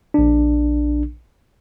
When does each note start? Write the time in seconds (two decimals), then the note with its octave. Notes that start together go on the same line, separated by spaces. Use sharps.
0.14 A#1 D4